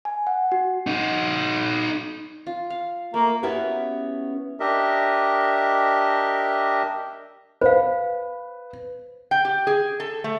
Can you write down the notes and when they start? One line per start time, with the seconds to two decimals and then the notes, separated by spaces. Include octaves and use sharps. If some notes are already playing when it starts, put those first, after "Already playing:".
0.05 G#5
0.27 F#5
0.52 F#4
0.87 D#4 F#4
2.47 F4
2.70 F5
3.14 A3 A#3 A#5
3.43 B3 C#4 E4 F#4 G4 B4
4.60 D4 G4 A#4 D#5 E5
7.61 B4 C5 F5
9.31 G5
9.45 G4
9.67 G#4
10.00 A4
10.24 A3